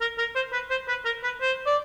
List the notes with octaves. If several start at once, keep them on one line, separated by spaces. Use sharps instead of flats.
A#4
A#4
C5
B4
C5
B4
A#4
B4
C5
D5